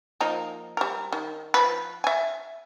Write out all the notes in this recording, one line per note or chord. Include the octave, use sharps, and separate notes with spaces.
F3 A#3 D#4
G3 A#4
D#3
F3 B4
E5 G#5